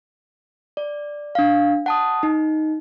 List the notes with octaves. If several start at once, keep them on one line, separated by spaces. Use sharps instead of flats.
D5
D4 F5
F#5 A5 D#6
D#4